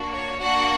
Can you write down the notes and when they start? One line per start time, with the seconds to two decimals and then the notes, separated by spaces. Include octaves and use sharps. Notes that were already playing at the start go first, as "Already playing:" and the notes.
Already playing: A#3 D4 F#4
0.13 C#5
0.40 A#3 D4 F#4 F#5